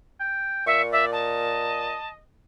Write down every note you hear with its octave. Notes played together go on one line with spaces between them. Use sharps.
G5
A#2 E5 C#6
D5 E5
D#5 A5